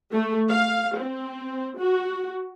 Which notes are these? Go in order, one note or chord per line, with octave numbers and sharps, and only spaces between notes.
A3
F5
C4
F#4